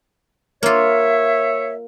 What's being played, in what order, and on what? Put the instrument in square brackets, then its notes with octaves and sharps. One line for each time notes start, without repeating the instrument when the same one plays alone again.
[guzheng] A#3 F4 [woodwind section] C#5 E5